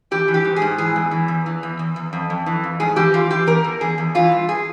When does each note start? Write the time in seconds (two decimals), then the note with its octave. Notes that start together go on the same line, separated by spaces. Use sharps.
0.11 E3 G4
0.28 E3
0.34 G4
0.45 G#2
0.56 G#4
0.62 G#2
0.78 E3 G#4
0.96 E2
1.11 E3
1.28 E2
1.46 E3
1.63 E2
1.79 E2
1.96 E2
2.13 F2
2.30 F2
2.46 E3
2.64 F2
2.80 G#2 G#4
2.96 E3 G4
3.13 E3 F4
3.30 E3 G4
3.47 E2 A#4
3.64 E2
3.81 E2 G#4
3.98 E2
4.15 E3 F4
4.32 G2
4.49 G#4